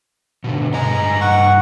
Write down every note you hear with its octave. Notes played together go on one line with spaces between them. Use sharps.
B2 D3
G2 D#5 G#5 A#5
F#5 C#6